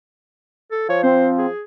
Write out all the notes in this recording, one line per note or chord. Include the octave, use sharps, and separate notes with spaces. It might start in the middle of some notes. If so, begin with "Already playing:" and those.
A4
F3 C#5
C4 C5
G#4